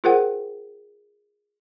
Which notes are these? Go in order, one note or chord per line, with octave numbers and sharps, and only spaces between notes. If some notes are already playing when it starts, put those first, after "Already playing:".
F4 G#4 A#4 C5 F#5 G5